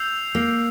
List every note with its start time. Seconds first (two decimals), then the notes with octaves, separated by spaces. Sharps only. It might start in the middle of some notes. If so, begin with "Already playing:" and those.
Already playing: E6 G6 C7 F7
0.35 A#3